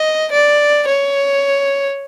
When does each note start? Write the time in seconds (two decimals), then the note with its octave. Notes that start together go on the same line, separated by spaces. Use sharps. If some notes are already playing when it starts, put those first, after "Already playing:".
Already playing: D#5
0.31 D5
0.88 C#5